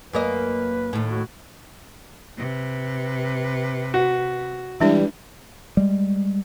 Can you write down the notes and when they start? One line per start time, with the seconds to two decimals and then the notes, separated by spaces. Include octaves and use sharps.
0.13 F#2 A#3 B4 D#5
0.93 D#2 A2
1.10 F#4
2.37 C3 B4
3.94 F#4
4.80 E3 G3 G#3 D4 E4
5.77 G3 G#3